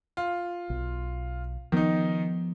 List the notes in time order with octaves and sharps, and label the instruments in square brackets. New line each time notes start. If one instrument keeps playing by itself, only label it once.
[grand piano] F4
[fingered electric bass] B1
[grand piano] D#3 D#4 [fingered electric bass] F3 B3